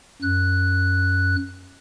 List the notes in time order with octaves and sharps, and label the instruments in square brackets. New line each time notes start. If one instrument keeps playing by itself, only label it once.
[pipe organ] F#2 F#6